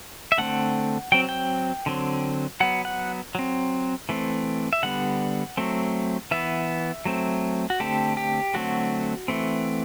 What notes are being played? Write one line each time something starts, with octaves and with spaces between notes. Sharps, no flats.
E5
D3 A3 C4 F#5
F#3 C4 G5
G5
D3 F#3 C4
F#3 B3 F#5
F#5
F#3 C4
E3 A3 C4
E5
D3 G3 B3 F#5
F#3 A3 C4
E3 B3 E5
F#3 A3 C4
F#4
D3 A3 C4 G4
G4
D3 F#3 A3 C4 F#4
E3 A3 C4